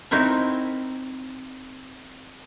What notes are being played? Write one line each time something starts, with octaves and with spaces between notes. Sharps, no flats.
C4 D#4 E4 F#4 A#4